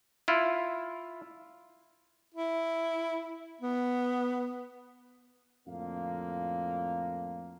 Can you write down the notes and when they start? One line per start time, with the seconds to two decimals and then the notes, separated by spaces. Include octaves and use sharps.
0.28 E4 F4
2.34 E4
3.61 B3
5.67 F2 A2 D3 A#3 F5